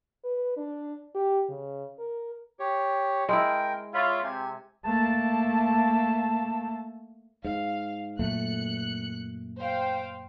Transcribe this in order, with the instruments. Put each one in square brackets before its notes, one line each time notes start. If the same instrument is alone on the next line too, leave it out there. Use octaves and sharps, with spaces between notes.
[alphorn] B4
D4
G4
C#3
A#4
[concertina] G4 C#5
[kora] G#3 E4 [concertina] A#4 G5
[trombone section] F4 [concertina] C#5 E5 B5
[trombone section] C3 [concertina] G#5
[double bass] A3 A#3 [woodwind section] A5
[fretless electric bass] G#2 [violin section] F5
[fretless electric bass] F#2 A#2 A3 [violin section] F#6 C#7
[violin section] C5 F5 G5